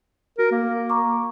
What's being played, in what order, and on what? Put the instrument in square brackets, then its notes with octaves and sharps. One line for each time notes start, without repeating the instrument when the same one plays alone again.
[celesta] F#4 [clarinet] A#4
[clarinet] A#3
[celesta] A#5 C#6 D6